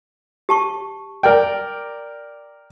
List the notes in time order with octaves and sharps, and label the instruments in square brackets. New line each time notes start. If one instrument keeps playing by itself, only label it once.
[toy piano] G4 A5 C#6
[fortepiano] A#4 D5 G5